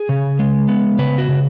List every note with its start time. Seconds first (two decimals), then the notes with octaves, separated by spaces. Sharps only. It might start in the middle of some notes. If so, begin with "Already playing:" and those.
Already playing: G#4
0.09 C#3
0.39 G#3
0.68 B3
0.98 C#3 B4
1.18 F#4
1.29 C#3